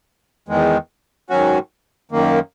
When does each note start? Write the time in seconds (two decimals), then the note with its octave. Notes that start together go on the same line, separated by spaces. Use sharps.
0.48 E2 D#3 G#3
1.30 G#2 D#3 F#3 C#4 F#4
2.11 F#2 D#3 A#3